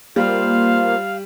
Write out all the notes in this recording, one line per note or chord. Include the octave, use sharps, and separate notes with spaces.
G3 A#3 F4 C5 F5